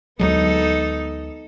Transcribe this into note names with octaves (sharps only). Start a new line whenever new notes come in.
D2 F#3 G#3 B3 D#4 A4